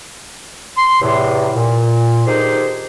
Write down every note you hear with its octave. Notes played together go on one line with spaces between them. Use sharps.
C6
E2 A2 C3
A#2
D3 D#3 D#4 G4 G#4 C5